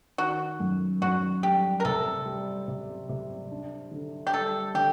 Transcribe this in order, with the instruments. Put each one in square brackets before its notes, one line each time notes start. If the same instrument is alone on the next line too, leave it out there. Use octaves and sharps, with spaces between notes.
[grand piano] D#3 [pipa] F#4
[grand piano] F#2
[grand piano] F#2 [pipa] F#4
[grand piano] G3 [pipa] G4
[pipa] A#4
[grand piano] C3 [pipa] A4
[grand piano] G3
C3
C3
D4
D3
[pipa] G4
[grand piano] G3 [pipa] A4
[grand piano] D3 [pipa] G4